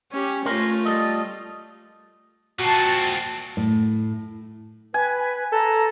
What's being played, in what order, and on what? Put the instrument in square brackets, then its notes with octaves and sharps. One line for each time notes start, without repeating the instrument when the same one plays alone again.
[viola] C#4 G4
[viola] A3 F4 [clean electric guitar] C#4 A#4 C5
[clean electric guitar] G3 A4 D#5
[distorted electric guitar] A#2 C4 [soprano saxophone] F#4 [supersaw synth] A5 A6
[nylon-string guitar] A2
[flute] B4 [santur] G#5
[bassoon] A4 [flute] A#5